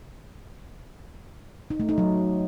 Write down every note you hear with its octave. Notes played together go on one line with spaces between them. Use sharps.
D#4
A3
D#4
F#3